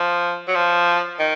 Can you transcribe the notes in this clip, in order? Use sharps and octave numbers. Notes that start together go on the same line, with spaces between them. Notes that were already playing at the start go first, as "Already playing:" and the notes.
Already playing: F3
F#3
F3
D#3